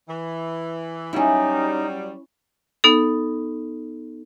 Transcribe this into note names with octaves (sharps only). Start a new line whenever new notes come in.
E3
F#3 G3 C#4 D#4 E4
B3 D#4 A4